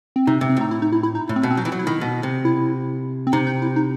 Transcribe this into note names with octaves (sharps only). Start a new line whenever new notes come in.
C4
C3 D#4
C3
C4
A2 D#4
E4
D#4
E4
E4
D#4
A2
C4
B2
C4
F#3 D#4
E3
F#3
E4
D#3
B2
C3
E4
C4
C3 D#4
D#4
E4
D#4